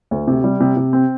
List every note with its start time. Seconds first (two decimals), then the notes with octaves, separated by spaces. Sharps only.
0.11 D2
0.27 C3
0.44 G3
0.60 C3
0.77 C3
0.93 C4